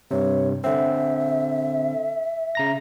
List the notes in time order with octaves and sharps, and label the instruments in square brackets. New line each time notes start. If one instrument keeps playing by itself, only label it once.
[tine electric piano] G2 C3 [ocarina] C#5
[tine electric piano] D3 C4 [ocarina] E5
[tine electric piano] C#3 A#5 A#6